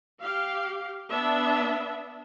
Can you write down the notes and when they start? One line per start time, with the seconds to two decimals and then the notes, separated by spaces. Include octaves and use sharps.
0.22 G4 F5
1.11 B3 D4 E5